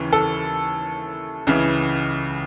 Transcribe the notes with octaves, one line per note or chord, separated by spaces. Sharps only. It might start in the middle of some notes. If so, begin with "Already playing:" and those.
Already playing: D#2 C#3 E3
A4
C#2 C#3 E3